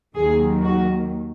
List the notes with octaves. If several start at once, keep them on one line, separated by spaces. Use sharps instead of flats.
D#2 D#3 F#3 G#4
F#4